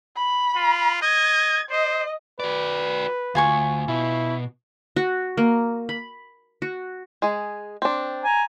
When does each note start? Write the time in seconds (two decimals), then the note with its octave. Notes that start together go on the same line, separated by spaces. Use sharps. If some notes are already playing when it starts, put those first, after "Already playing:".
0.16 B5
0.55 F4
1.02 D#5 G#6
1.70 C5 D#5
2.40 F#4 B4 D5
3.35 D2 F4 G#5 C#6
3.88 B2 E4
4.96 F#4
5.37 A#3
5.89 B5
6.62 F#4
7.22 G#3 G#4
7.82 C4 D4
8.24 G#5 A#5